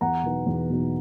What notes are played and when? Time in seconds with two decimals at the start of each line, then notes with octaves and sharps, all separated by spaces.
0.01 E2 F#5 A#5
0.23 B2 F#3 B3 D#4
0.47 E2
0.70 B2 F#3 B3 D#4